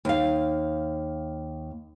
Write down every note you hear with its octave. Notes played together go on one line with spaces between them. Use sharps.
D#2 F5